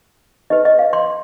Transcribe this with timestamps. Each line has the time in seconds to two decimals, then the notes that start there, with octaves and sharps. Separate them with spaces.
0.50 D#4 G4 B4 D#5
0.65 D#5
0.79 F5
0.93 C6